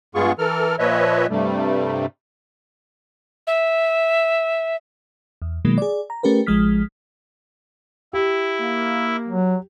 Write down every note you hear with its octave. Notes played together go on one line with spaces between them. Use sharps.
G2 G#3 B3 F4 G#4 C#6
E3 A4 A#4 F6
A#2 F3 B4 C#5 D#5 E5
G2 C3 G3 A3
E5
E2
B2 D#3 F#3 G#3 A#3
G#4 D5
A#5
A3 C#4 G4 A#4 B4
A1 F3 G#3 D#6 F6 B6
E4 G4
A#3
F#3